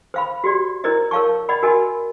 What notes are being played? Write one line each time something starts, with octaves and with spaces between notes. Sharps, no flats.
C5 F5 B5
F#4 G4 D5
E4 A#4 C5 D5 D#5
A#4 C#5 F5 A5 C#6
D5 D#5 F#5 B5
F#4 A#4 D#5 G#5